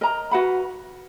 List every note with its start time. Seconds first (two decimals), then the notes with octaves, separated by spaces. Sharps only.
0.01 A#4 D#5 A#5
0.31 F#4 B4 F#5 B5